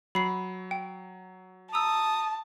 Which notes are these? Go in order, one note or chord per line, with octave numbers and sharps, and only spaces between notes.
F#3 B5 C7
G5
A5 A#5 D#6 E6